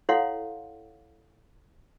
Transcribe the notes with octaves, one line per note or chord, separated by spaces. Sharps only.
E4 A4 C#5 F5 F#5 C6